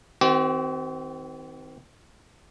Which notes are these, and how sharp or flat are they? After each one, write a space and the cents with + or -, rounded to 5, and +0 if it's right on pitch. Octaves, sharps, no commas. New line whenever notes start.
D#3 +35 C4 -10 F#4 +45